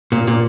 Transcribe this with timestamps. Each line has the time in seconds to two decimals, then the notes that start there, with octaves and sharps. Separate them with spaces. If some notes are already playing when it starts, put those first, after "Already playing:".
0.12 A#2
0.27 A#2